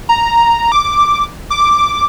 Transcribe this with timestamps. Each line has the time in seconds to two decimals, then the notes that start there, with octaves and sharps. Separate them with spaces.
0.09 A#5
0.72 D6
1.50 D6